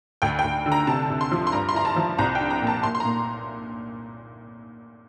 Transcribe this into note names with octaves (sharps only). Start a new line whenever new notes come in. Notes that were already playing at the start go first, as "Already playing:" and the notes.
D2 G5
G5
D2
D3
A#5
C3 A5
C3
C6
F3
C6
G2 A#5
C6
E4 A#5
A5
F3
C2 A#5
G5
D4
A#5
A#2
A5
A#2 C6
C6
A#5
A#2